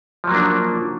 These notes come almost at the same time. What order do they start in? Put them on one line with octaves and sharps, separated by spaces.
F3 F#3 A#3 D4